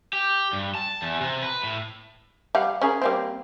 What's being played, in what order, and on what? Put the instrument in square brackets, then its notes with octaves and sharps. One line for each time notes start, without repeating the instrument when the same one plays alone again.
[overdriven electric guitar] G4
G2
A5
E2
C3
B4
A2
[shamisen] G3 F5 F#5
C#4 G#4 A#4
G3 A#3 C4